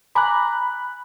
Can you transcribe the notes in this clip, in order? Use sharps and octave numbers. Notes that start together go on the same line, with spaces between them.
G#5 A#5 B5 D6 F#6